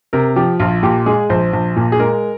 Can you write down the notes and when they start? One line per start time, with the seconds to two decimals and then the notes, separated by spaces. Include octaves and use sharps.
0.13 C3 A#4
0.36 F3 G4
0.59 A#1 F4
0.83 A#2 G4
1.06 G#3 G#4
1.29 A#1 C5
1.53 A#1
1.76 A#2
1.92 G#4
1.99 G#3 A#4